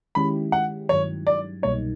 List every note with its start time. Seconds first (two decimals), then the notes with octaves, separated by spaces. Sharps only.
0.15 D#3 G#3 C#4 E4 G4 B5
0.52 F#5
0.89 G2 D#3 F#3 C#5
1.27 D5
1.62 C2 B2 G3 A#3 D#4 C#5